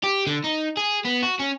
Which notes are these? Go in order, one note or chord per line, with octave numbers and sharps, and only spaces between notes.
G4
D3
D#4
G#4
B3
F#4
C#4